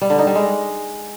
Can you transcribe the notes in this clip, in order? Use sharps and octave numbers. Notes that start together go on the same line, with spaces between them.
G3
D3
D#4
G3
G#3